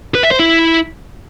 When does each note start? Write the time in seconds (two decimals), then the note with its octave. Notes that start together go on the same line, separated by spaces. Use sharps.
0.15 B4
0.23 E5
0.31 C5
0.39 E4